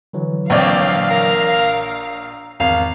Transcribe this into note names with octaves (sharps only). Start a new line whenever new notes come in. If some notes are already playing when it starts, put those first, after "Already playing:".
D3 E3 F#3
A#1 C4 C#5 D5 F5
A#4
A#5
G#1 E2 F5